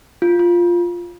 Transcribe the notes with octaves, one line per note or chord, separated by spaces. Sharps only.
F4
F4